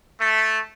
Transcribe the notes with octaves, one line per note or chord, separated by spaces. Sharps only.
A3